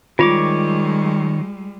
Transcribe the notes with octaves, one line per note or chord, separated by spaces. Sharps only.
D#3 G3 G#3 F4 C#5 D6